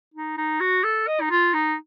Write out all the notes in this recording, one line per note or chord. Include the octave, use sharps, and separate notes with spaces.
D#4
D#4
F#4
A4
D#5
D#4
F4
D#4